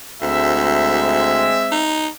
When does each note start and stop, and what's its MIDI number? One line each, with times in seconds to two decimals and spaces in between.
0.22 1.49 38
0.22 1.88 56
0.22 1.88 60
0.22 1.88 76
1.71 2.07 63